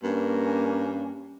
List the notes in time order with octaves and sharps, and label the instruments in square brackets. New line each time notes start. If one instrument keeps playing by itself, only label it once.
[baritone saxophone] G2 [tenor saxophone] A#3 [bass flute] C#4